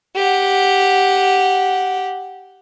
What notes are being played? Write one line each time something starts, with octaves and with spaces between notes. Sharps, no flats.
G4 F#5